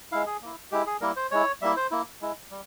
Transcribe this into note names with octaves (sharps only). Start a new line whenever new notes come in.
G#3 E4 F5
G#4
A#3 E4
G#3 E4 G4
G#4
G3 A#3 E4 A#4
C5
G#3 E4 C#5
G3 A#3 E4 E5
C5
A#3 E4
G#3 E4
G3